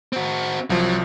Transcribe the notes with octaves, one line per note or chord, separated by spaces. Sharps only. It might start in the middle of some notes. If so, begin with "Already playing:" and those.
C4 F#4
C2 F3 F#3